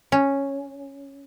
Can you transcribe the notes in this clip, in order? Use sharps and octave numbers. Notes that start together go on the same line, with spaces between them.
C#4